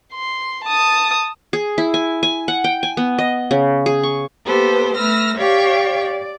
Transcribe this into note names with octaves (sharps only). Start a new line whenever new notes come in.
C6
A5 D#6
G#4
E4
G#5
G#5
F#5
G5
G#5
B3
D#5
C#3
G#4
C#6
A#3 B3 G4 A4 B4 C5
A3 B4 E6 F6 A#6
G4 C#5 D5 F5 G5 C#6
D5